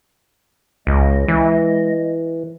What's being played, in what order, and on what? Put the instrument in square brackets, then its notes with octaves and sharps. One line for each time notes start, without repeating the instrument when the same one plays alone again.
[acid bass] C#2 [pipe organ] G#3 D#5
[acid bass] E3